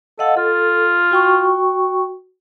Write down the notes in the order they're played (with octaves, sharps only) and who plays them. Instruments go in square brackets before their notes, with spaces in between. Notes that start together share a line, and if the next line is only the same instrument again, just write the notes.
[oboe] A4 [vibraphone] D#5 F5 F#5
[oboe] F4 [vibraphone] A4
[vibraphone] F#4 G5 C#6